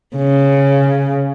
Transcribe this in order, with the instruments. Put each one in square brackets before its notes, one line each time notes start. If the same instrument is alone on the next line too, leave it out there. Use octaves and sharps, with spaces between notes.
[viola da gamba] C#3